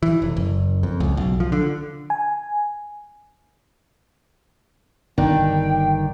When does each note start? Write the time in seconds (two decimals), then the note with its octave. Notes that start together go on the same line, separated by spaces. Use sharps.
0.03 E3
0.22 F1
0.37 F#1
0.83 F2
1.00 C#2
1.17 B1
1.40 F3
1.52 D3
2.10 G#5
5.18 G1 D#3 D4 G5